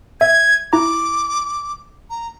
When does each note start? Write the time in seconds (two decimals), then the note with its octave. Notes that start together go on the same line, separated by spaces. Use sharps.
0.21 E5 G#6
0.73 E4 A#5 D6
2.10 A#5